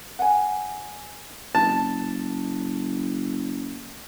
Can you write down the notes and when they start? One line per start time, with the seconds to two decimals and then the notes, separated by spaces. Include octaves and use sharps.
0.19 F#5 G#5
1.55 F#1 A5